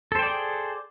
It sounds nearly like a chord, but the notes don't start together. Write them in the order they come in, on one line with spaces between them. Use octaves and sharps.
A4 C5 G5 D5 G#4